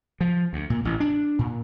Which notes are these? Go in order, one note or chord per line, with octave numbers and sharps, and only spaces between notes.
F3
D2
A#2
A1
D4
A#2